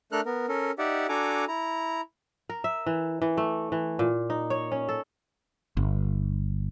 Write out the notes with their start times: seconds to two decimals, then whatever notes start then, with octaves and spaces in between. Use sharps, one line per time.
0.12 A3 D4 A4 A#4 F6 F#6
0.26 B3 A#4
0.48 C#4 A4 A#4
0.78 D#4 G4 D5 E5 F#5
1.09 D4 F#4 A4 G#5 A#5 D6
1.48 E4 A#5
2.50 A#4
2.64 E5
2.86 E3
3.22 E3
3.37 A3
3.72 E3
3.99 A#2
4.30 D#4
4.50 C#5
4.72 C#4
4.89 A4
5.77 G1